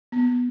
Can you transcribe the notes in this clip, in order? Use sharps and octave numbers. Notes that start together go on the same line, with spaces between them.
B3